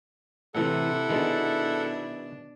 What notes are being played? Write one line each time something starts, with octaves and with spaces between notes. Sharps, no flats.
A2 C3 E3 E4 A4 F#5
B2 D#3 G#3 B3 D4